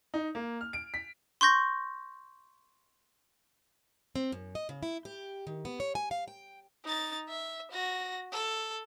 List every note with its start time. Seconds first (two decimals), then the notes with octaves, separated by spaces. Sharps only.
0.14 D#4
0.35 A#3
0.61 F6
0.73 D7
0.94 B6
1.41 C6 C#6 G6 A#6
4.16 C4
4.32 F#2
4.55 D#5
4.69 C#3
4.83 E4
5.05 G4
5.47 D#3
5.65 B3
5.80 C#5
5.95 G#5
6.11 F5
6.28 G5
6.85 D#4 A6
7.29 E5
7.71 F#4 A#6
8.32 A4